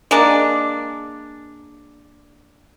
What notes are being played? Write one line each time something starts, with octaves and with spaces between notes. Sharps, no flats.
G#3 A#3 D4